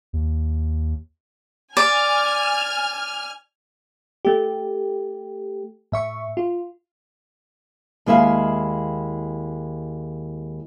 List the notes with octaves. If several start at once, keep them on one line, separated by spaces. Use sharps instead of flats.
D#2
D5 G#5 F6
A3 G4
A2 E5 C#6
F4
D#2 G#3 E4 E5 F5